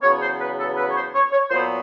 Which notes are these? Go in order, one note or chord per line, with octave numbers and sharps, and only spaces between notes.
E2 C#3 F#3 B3 C#5
C5
B4
A4
B4
C#5
C5
C#5
C#5
A#2 F#3 B3 C5